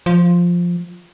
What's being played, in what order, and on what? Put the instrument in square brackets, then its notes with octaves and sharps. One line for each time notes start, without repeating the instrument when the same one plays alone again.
[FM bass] F3